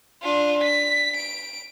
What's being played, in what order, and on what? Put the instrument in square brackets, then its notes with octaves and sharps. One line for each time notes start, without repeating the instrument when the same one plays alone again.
[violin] D4 F4
B6
D7